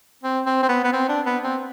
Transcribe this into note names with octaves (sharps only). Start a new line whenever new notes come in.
C4
C4
C4
B3
B3
C4
D4
B3
C4